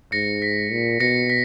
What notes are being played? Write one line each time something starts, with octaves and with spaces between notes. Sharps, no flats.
G#2 A#6 C#7
B6
A#2
B2 A#6 C#7
B6